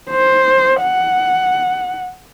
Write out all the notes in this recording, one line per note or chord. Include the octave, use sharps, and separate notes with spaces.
C5
F#5